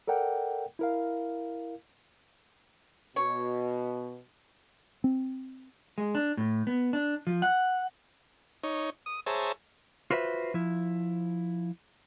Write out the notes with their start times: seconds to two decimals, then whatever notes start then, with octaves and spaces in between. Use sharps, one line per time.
0.07 A4 A#4 D5 F#5 G5
0.79 E4 A#4 F5
3.16 B2 C#5
5.04 C4
5.98 G#3
6.15 D4
6.37 A2
6.67 B3
6.93 D4
7.27 F3
7.42 F#5
8.63 D#4 C#5
9.06 D#6
9.26 G#4 C5 C#5 E5 A5 A#5
10.11 F4 F#4 B4 C5 E5
10.54 F3 E4